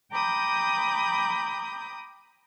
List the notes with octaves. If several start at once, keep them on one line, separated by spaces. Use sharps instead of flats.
G5 A#5 B5 D6 D#6 G6